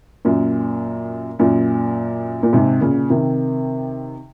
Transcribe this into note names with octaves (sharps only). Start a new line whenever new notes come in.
F#2 A#2
F#2 A#2
A#2
G#2 C3
A#2 C#3
C3 D#3